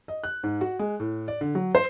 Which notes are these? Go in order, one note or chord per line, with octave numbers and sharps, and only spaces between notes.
D#5
F#6
G#2
F#4
G#3
A2
D5
D3
F#3
C5